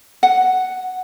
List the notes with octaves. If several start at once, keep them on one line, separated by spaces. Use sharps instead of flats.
F#5